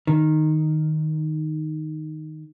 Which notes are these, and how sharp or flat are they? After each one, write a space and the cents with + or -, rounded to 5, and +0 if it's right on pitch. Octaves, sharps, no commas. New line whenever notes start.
D#3 -5